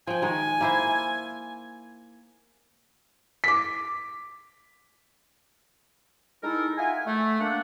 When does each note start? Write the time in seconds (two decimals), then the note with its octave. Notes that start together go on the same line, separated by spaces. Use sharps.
0.07 F3 G5 G#5
0.22 D#3 G#3
0.61 A#3 E4 C5
3.44 D6 B6
6.42 G#3 D#4 E4 A4 A#4
6.77 F4 E5 F#5 G#5
7.06 A3
7.40 A#3 D4 F#5